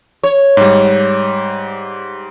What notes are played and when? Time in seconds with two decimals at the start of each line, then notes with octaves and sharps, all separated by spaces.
0.23 C#5
0.57 G#2 G3